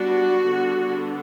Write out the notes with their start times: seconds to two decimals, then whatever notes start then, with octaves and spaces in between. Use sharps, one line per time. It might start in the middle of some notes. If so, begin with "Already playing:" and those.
Already playing: G3 B3 D4 F#4
0.47 D3 G3 B3 D4